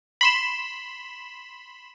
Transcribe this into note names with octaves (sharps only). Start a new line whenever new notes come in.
B5 C6 E7